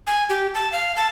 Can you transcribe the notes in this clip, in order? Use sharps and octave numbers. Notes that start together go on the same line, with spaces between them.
G#5
G4
A5
F5
A5